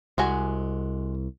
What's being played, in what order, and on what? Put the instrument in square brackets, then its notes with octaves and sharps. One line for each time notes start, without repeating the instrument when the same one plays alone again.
[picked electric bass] C2 [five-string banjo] G#3 F#4 G#5